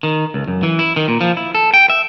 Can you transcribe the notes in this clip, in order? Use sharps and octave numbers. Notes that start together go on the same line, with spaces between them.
D#3
C#2
F#2
E3
E4
D#3
A#2
F3
E4
A4
G5
E5